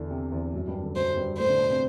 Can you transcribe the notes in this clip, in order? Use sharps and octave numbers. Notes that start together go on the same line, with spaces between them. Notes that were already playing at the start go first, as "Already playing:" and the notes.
Already playing: E2 D3 E3
C3
E2 E3
F#2 F#3
G2 G3
D3
F#2 F#3 C5
G2 G3
A2 A3 C5
D3 D4
B2 B3
C3 C4